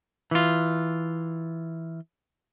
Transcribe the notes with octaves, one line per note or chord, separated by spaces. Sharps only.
E3 F4